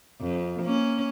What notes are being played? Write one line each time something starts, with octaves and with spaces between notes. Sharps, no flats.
F2
A#3 C#4